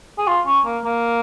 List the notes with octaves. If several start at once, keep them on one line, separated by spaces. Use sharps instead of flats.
G#4
F4
C#4
A#3
A#3